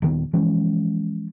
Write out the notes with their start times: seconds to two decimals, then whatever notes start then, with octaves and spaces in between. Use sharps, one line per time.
0.02 D#1 D#3 B3
0.33 E3 F3 G#3 C#4